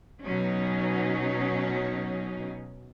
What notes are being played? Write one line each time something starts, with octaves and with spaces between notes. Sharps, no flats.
B2 F#3 C#4 D#4